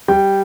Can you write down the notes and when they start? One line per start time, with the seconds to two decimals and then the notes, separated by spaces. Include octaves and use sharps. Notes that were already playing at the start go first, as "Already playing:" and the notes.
0.08 G3 G5